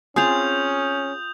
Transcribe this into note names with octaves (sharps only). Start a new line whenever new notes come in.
C4 C#4 F4 G#4 D#6 G6 F7